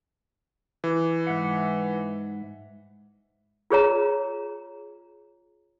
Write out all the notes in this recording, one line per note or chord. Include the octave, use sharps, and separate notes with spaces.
E3
G#2 E5 F#5
F4 G#4 C#5 A#5